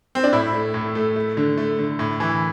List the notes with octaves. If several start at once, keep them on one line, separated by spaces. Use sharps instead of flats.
C4
D4
A2 E4
A3
A2
A3
A3
D3
A3
D3
A2
E3